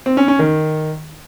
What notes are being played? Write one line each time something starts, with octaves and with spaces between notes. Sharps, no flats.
C4
C#4
C#4
D#3